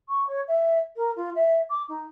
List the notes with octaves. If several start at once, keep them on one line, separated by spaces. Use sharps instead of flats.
C#6
C#5
E5
A#4
F4
E5
D6
D#4